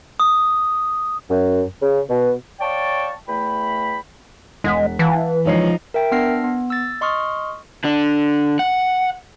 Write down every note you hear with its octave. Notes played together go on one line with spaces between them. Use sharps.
D#6
F#2
C#3
B2
C#5 D5 F5 G5 A5 C#6
E2 A3 G5 B5
E1 G#3 F#5 B6
E3 F5 F#5 A5
C#2 F3 D#4 C#5 C7
A#4 E5 G5
B3 D4 E6 F6 A#6 C7
B3
E6 A6
D#5 C6 C#6 D#6 F6
D3 D4
F#5